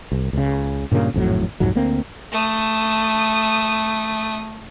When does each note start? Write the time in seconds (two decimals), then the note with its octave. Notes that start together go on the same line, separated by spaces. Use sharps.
0.12 C2
0.33 C#2 C#3
0.91 G2 A#2 C#3 A#3
1.14 G#1 F2 A2 F#3
1.60 C2 F2 G#2 F#3
1.75 D2 A#3 C4
2.32 A3 D#6